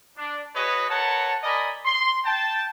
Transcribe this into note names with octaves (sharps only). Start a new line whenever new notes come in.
D4
F#4 G#4 B4 C#5 D#5
A#4 B4 C#5 F#5 A5
A#4 D5 D#5 G#5 B5
C6
G5 A5